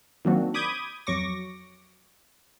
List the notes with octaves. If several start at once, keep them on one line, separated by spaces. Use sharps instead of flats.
D#3 F#3 A#3 C4 D4 F#4
B5 D6 D#6 G6 G#6
F2 F#3 C#6 D6 A#6